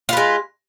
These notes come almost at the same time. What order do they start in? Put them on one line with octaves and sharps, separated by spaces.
F4 B4 G#3